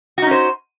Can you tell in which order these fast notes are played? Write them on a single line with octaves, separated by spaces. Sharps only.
F#4 D#4 C#4 C5